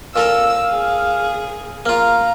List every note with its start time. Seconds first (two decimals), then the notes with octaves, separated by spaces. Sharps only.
0.16 A#2 A4 A#4 F5 E6
0.70 G#4
1.86 A#3 F4 F5 A#5